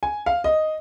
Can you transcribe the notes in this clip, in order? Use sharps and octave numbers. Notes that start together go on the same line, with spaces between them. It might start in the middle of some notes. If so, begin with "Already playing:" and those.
G#5
F5
D#5